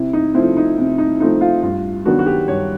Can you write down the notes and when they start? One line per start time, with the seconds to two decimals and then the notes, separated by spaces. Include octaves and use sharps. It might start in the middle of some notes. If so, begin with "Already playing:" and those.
Already playing: C3 E4
0.13 D#4
0.34 F3 A3 C4 E4
0.57 D#4
0.78 C3
0.98 D#4
1.20 F3 A3 C4 D#4
1.41 F4
1.63 G2 F4
2.06 D#3 F#3 B3 D4 F#4
2.19 F#4
2.26 G4
2.48 G2 C#5